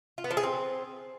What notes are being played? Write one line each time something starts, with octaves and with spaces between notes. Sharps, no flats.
F4
B3
F3
G#4
C4